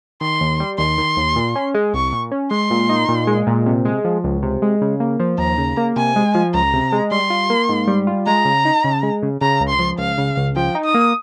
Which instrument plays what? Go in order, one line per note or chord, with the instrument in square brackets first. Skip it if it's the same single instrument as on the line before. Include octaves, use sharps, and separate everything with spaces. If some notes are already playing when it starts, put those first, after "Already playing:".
[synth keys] D#3 [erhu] C6
[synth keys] D#2
G3
[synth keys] D#2 [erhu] C6
[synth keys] D#3
D#2
A#2
C#4
G#3
[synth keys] C2 [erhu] C#6
[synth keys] A#2
C#4
[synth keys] G#3 [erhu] C6
[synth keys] A#2
D#4
A#2
G#3
A#2
C3
G#3
F3
C#2
C3
G#3
C#3
A#3
F3
[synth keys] D#2 [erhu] A#5
[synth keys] C#3
A#3
[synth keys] C3 [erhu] G#5
[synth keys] G#3
F3
[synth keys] C#2 [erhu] A#5
[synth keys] C3
G#3
[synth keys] G3 [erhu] C6
[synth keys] F4
A#3
G#2
G3
F4
[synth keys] G#3 [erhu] A#5
[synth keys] C#3
D#4
C#3
G#3
C#3
[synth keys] C#3 [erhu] A#5
[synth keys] C#2
[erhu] C6
[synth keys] F3
[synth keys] C#2 [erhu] F5
[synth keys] C#3
C#2
[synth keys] F3 [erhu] G5
[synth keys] D#4
[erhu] D#6
[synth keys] A#3